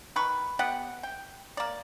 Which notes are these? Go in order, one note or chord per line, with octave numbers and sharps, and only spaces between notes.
D#3 B4 C#6
B3 G4 F#5
G5
A#3 D5